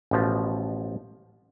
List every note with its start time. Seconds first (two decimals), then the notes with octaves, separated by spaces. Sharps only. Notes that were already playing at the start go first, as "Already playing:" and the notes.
0.11 A1 B2 F3